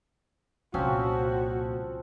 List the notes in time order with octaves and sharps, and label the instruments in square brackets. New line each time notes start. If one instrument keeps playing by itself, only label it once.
[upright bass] C2 A#2 [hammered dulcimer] F3 C4 C#4 [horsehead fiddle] F#4